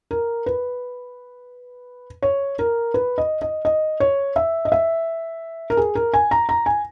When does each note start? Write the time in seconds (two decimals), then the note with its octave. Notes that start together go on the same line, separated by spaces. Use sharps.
0.11 A#4
0.46 B4
2.23 C#5
2.59 A#4
2.94 B4
3.18 D#5
3.42 D#5
3.65 D#5
4.00 C#5
4.36 E5
4.65 D#5
4.72 E5
5.70 A#4
5.77 G#4
5.95 A#4
6.14 G#5
6.31 A#5
6.49 A#5
6.66 G#5